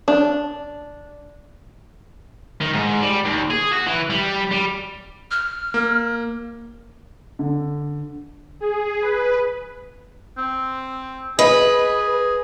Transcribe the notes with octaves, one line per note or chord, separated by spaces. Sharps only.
D4
D#3
G#2
G3
D#2
G#4
F#4
E3
G3
G3
F6
A#3
D3
G#4
B4
C4
G#4 B4 D#5